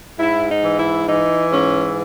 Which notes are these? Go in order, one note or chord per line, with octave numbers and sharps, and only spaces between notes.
G#2 E4
D#4
E3
E4
E3 D#4
G#2 C#4